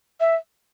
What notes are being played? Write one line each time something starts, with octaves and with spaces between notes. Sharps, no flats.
E5